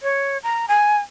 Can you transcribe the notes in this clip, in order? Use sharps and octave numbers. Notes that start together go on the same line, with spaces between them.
C#5
A#5
G#5